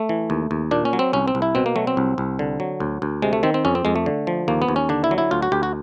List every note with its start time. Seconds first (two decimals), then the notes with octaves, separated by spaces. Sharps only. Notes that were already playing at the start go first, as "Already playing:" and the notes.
Already playing: A3
0.09 E3
0.30 D#2
0.51 D#2
0.71 A#2 D4
0.85 C#4
0.93 F#3
0.99 C4
1.13 C2 C#4
1.28 C4
1.35 C2
1.42 E4
1.55 B2 C4
1.66 A#3
1.76 F#3 A3
1.87 C4
1.97 C2
2.18 C2
2.39 D3
2.60 F#3
2.80 D2
3.02 D2
3.22 C3 G#3
3.33 A3
3.43 D#3 C4
3.54 C4
3.65 F2 C#4
3.75 C4
3.85 F2 G#3
3.96 A3
4.06 D3
4.27 F3
4.48 D#2 A#3
4.62 B3
4.68 D#2
4.76 C#4
4.89 D3 D4
5.04 E4
5.11 F#3
5.18 E4
5.31 D2 F4
5.42 F#4
5.52 D2 G4
5.63 F#4